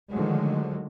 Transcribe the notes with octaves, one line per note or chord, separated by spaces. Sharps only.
D3 D#3 F3 F#3 G#3 A3